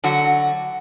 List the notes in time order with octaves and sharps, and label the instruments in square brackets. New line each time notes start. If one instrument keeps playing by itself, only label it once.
[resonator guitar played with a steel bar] D3 F#3 F#4